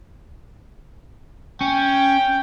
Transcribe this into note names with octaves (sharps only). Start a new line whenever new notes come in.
C#4 G5